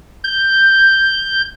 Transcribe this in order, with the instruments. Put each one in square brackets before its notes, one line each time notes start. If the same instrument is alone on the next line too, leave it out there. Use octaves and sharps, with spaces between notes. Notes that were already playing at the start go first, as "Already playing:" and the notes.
[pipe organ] G6